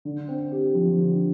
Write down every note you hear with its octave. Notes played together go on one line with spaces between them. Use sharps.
D3
C4
G4
F3
D3